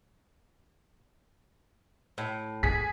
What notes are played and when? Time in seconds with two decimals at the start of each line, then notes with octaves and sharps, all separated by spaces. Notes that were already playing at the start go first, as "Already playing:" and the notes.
2.18 A2
2.63 G#2 G#4 B6